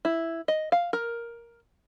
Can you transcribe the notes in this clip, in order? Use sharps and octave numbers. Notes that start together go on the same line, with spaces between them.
E4
D#5
F5
A#4